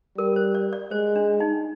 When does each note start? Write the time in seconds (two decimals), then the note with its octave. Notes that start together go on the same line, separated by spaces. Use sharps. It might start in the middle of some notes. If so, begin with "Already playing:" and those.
0.17 G3 A#4
0.36 C5
0.55 D5
0.73 D5
0.91 G#3 C5
1.16 D4
1.40 D#4